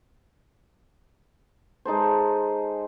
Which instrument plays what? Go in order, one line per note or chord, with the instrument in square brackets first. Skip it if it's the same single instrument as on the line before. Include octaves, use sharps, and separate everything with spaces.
[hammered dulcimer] G#3 D#4 A4 C5